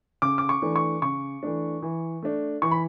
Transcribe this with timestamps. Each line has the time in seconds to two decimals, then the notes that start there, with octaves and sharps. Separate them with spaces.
0.22 C#3 D6
0.38 D6
0.49 C#6
0.62 E3 A3 D4
0.76 C#6
1.02 C#3 C#6
1.43 E3 A3 D4
1.82 E3
2.23 A3 D4
2.62 E3 C#6
2.71 B5